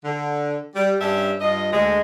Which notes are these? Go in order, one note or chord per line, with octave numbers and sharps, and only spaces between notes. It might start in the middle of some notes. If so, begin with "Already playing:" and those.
D3
G3
G2 C#4 D4 G4 E5
G2 F4 D#5
D2 G#3